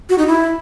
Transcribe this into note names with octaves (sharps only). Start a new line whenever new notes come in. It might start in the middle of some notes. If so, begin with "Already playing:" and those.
F#4
D#4
E4